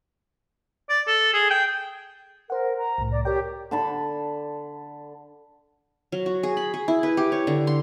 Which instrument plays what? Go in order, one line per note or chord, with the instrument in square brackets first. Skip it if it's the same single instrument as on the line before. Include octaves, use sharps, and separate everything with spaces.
[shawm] D5
A4
G#4
G5
[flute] A#4 [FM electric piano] C5 F#5
[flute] A#5
[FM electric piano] C2 A2
[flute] D5
[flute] G4 [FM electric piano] A#4 C#5 G5
[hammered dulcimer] D3 A5 B5
[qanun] F#3
F#4
G#4
B5
G#4
E4
B4
G4
C#5
D3
C6